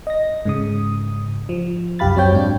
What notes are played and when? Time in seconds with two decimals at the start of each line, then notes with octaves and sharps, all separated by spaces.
0.07 D#5 A#6
0.45 G#2 C#3 D#6
1.49 F3
1.99 C2 F#2 G4 F5 B5 A6
2.15 F#2 F#3 C4 C#5 G5 G6
2.33 G#2 D4